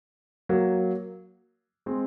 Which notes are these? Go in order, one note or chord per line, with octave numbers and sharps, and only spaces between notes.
F#3 A#3
G#3 C4